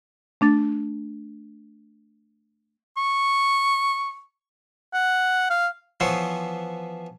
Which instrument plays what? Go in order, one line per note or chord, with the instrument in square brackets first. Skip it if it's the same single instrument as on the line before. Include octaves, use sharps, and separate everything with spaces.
[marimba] A3 D4 A6
[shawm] C#6
F#5
F5
[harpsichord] E3 F3 B3 E4 C5 C#5